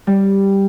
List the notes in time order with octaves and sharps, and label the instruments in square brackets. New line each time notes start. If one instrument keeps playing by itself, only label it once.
[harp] G3